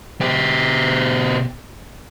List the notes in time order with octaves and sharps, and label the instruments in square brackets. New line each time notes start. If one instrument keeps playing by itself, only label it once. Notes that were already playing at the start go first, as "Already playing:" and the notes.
[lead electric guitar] B2 G4